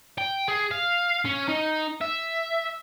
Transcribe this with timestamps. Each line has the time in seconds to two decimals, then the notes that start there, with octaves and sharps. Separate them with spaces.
0.18 G5
0.48 G#4
0.71 F5
1.25 C#4
1.49 D#4
2.01 E5